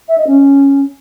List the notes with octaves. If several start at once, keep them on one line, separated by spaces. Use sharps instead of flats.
E5
D#5
C#4